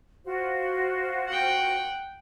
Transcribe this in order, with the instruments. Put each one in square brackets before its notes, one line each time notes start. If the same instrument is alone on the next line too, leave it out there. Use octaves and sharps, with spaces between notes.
[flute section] F4 F#4 C5
[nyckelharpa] F#5 G5